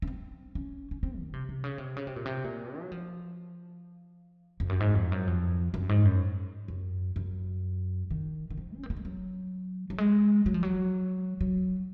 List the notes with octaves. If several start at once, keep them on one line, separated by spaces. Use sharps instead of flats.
C#4
C4
C#4
C#4
C4
D#3
C3
C3
C#3
C3
C#3
C3
A#2
C3
A#2
F#3
F3
F2
F#2
G#2
F2
F#2
F2
F#2
G#2
F#2
F#2
F#2
D#3
D#3
F3
C#4
C4
A#3
G#3
F#3
F#3
G#3
F#3
F3
F#3
F#3